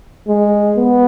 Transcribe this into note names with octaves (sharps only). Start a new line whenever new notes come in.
G#3
B3